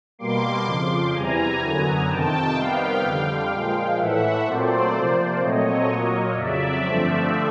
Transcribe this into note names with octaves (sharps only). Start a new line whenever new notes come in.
B2 G3 A#3 C6 D6
F2 C#3 F3
E2 C3 E3 G3 G#5 A#5
F#2 D3 F#3 B3
F2 C3 D#3 G5 A5
C3 D#3 G3 B3 F5 G5
F2 D3 G3
A#2 F3 G#3
A2 E3 A3 E5 F#5
A#2 F#3 A3 C4 C5 D5
C3 F3 A#3
A#2 F#3 A3 C4 C#5 D#5
A#2 F#3 A#3
F2 C#3 F#3 D5 E5
G2 D3 F3 A3 C4